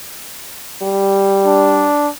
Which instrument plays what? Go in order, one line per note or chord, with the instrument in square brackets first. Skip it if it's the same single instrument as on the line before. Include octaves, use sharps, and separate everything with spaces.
[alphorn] G3
[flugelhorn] D4